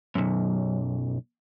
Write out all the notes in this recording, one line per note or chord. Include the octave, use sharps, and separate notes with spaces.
B1 F#2